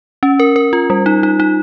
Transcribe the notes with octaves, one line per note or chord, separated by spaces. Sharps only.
C#4
A#4
A#4
F4
G3
D#4
D#4
D#4